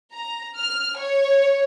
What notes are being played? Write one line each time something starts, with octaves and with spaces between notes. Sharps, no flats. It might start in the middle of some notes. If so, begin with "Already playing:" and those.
A#5
F6
C#5